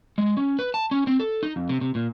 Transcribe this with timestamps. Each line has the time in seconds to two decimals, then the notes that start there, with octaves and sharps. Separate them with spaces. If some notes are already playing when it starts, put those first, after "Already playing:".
0.18 G#3
0.37 C#4
0.59 B4
0.74 A5
0.91 C#4
1.07 C4
1.20 A4
1.43 D#4
1.56 F2
1.69 C3
1.81 C3
1.95 A#2